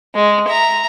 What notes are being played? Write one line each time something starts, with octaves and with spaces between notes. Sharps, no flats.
G#3
E5 A#5